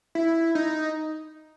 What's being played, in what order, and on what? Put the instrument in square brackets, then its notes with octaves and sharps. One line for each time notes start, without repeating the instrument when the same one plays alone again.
[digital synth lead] E4
D#4